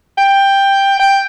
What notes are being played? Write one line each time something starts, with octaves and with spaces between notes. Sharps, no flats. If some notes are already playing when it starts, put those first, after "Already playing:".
G5
G5